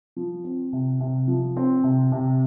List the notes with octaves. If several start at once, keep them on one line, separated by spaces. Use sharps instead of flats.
F3
C4
C3
C3
F3
C4
C3
C3